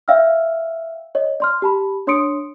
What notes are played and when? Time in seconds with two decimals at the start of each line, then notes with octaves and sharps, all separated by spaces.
0.08 D5 E5 F5 G5 E6 F6
1.15 C#5 D#5
1.40 D5 C6 F6
1.62 G4 A5 B5
2.07 D4 C#5 C6 D#6 C#7 D7